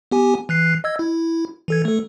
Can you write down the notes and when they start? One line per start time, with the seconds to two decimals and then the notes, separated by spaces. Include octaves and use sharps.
0.11 B3 G4 G#5
0.49 E3 F#6 C7
0.84 D#5 E6 G#6
0.99 E4
1.68 E3 A4 G#6
1.85 A3 A4